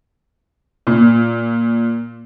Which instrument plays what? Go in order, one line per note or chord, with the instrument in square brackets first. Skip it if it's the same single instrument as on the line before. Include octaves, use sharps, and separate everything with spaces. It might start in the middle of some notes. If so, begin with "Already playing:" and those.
[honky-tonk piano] A#2